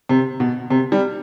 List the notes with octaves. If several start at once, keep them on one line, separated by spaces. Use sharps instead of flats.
C3
B2
C3
G3